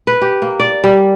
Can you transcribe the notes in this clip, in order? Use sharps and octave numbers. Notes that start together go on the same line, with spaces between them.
B4
G4
A#3
D5
G3